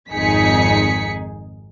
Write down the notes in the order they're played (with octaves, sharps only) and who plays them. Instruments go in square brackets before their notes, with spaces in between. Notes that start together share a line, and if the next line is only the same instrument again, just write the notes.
[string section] G#1 F2 D#4 G#4 B6 C#7